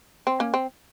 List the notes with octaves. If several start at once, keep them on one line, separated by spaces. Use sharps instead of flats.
C4
A#3 C#4
C4